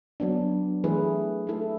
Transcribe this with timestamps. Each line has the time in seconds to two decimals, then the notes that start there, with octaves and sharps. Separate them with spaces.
0.20 F#3 B3 D4
0.84 E3 A3 E4 G#4 B4
1.47 A3 E4 A4